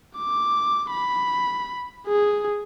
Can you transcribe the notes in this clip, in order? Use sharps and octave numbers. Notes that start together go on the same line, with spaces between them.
D6
B5
G#4